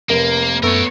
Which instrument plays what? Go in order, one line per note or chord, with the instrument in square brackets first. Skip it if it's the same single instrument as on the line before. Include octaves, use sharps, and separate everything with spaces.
[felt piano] F1 [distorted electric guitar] A#3 [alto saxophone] A#4
[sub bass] F#2 [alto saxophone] A3 [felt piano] B3 [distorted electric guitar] A#4 C#5